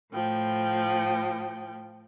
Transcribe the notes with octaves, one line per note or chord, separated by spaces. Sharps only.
A2 F3 G5